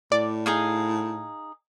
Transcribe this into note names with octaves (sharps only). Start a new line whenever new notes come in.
A2 D5
D#4 G#4 F5